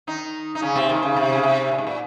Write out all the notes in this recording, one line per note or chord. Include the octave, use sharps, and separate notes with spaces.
D#3 D#4
D#4
C#3 C#4
C3 C4
D#2 D#3
C#3
C3
C#3
C3
A#2
G#2
A#2